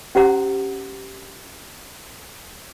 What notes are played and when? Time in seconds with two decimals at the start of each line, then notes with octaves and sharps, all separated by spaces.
0.15 C#4 G4 C5 F#5 A#5